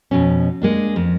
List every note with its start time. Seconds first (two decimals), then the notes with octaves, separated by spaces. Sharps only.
0.11 F2 B2 C#4
0.61 G#3 A#3 D4
0.96 F2